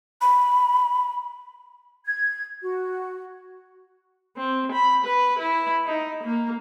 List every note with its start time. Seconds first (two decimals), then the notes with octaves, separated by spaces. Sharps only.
0.21 B5
2.06 G#6
2.62 F#4
4.37 C4
4.72 B5
5.05 B4
5.38 E4
5.86 D#4
6.23 A#3